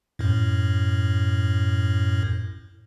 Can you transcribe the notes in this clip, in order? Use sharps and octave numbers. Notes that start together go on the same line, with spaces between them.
F#2 A2